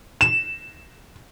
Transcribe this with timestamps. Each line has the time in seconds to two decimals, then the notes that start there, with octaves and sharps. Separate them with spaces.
0.21 E7